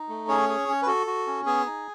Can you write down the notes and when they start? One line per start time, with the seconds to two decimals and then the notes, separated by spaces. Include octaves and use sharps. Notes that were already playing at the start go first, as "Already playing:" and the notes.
Already playing: D#4
0.09 A3
0.28 C#4 G#4 C#5
0.49 G#4
0.68 C#4
0.82 B4
0.87 F#4 A4
1.07 F#4
1.27 C#4
1.46 B3 G#4 G#5
1.66 D#4